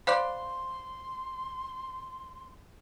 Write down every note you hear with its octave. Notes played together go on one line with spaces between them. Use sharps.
C5 D5 F5 B5 C6 F#6